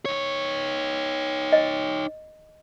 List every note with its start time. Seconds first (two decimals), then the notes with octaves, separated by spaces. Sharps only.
0.05 D#4 C#5
1.53 D#5